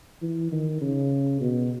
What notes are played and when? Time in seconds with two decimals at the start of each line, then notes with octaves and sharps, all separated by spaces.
0.22 E3
0.52 D#3
0.81 C#3
1.41 B2